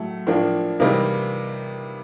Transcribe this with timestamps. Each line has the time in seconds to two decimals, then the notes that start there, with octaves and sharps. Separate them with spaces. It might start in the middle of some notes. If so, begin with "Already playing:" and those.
Already playing: A2 F#3 A3
0.27 A2 F3 A#3 D4
0.80 C3 E3 G3 A#3 D#4